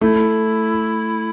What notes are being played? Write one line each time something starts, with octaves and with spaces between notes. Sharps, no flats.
A3 E4